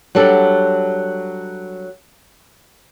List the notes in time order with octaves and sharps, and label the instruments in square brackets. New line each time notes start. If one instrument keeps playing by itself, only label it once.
[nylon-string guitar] F#3 G3 D4 A4